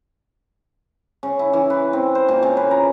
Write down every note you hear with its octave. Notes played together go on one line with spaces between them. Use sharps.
C#3
E4
E3
B4
C4
C5
A#2
C#3
B4
A#5